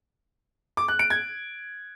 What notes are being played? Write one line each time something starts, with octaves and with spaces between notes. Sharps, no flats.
D6
F#6
D7
G#6